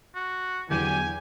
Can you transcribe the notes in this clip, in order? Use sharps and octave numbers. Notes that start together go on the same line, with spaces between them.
F#4
E2 D3 E3 F#3 G4 G#5